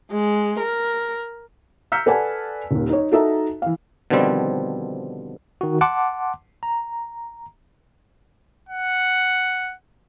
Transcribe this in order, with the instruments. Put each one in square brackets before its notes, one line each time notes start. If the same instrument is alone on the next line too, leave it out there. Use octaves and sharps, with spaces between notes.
[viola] G#3
A#4
[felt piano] A#5 E6 F6 G6 B6 C#7
A4 B4 D5 F#5 G#5 A5
D#1 D#2
D#4 C#5
D#4 F#4 A4 D#5 E5 A#5
E3 F5
[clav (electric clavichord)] B2 D3 D#3 F3 G3 C4
[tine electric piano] D#3 F#4
F#5 A5 C6 D6
A#5
[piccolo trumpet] F#5